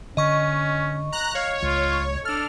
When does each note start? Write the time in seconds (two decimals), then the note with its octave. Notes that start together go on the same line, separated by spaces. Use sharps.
0.17 D3 C#4 D#5 C#6
1.12 A#5 F#6
1.35 C#5 F5
1.62 C#2 F4
2.25 D4 A4 F6